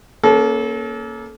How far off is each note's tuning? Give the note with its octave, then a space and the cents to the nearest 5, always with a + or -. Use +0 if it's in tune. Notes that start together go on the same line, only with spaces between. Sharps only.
A#3 +10 C#4 +0 A4 -30